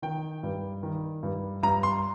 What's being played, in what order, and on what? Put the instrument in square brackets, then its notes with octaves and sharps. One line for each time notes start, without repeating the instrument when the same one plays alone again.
[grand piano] D#3 G5
G2
D#3
G2
G2 A#5
C6